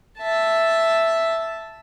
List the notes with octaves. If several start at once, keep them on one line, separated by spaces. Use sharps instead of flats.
E5 A5